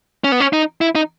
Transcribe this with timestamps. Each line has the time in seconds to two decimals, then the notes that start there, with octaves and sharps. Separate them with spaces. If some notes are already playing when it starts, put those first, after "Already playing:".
0.24 C#4
0.32 B3
0.40 C#4
0.53 D#4
0.81 E4
0.95 D#4